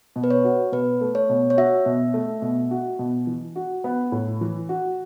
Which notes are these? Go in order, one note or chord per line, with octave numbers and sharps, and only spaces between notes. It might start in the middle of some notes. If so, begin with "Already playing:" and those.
B2
B4
C#5
F#4
B2 B4
A3
C#5
B2
C#5
F#4 E5
B2
A3
B2
F#4
B2
E3
F#4
B3
A2
E3
F#4